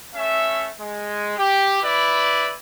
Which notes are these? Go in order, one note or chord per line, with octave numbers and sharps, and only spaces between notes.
A3 C#4 E5
G#3
G4
E4 B4 D5